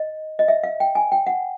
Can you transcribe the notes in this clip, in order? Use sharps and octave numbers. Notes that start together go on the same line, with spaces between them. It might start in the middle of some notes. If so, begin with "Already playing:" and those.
Already playing: D#5
D#5
E5
F5
G5
G#5
G5
F#5